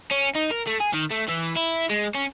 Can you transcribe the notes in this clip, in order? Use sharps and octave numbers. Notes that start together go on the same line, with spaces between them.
C#4
D#4
A#4
A3
G#4
D#3
A3
E3
E4
G#3
C#4